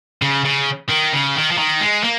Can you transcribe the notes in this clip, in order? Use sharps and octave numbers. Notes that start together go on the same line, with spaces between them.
C#3
C#3
D#3
C#3
D#3
F3
D#3
G#3
A#3